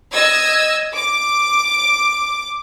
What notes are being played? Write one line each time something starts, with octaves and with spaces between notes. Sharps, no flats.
D#5 E6 G#6
D6